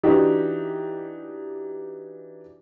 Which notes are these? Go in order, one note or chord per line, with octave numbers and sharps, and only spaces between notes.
E3 D4 D#4 F#4 G4